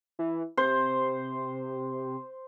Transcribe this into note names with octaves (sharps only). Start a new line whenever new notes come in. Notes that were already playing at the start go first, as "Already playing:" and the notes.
E3
C3 C5